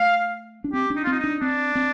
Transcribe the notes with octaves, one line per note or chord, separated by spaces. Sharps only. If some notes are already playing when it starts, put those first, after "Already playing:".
Already playing: A3 F5
D4
C4 G4
D4
D#4
F4
C4 D#4
D4 D#4
C4 D4
C4